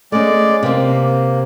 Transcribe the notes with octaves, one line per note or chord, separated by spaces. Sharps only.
G#3 A3 C#4 D5
C3 A#3 C4